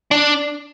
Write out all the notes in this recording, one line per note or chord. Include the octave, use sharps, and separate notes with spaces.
D4